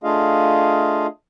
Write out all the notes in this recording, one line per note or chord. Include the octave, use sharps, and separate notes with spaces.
A3 D4 F4 G#4 D#5 F5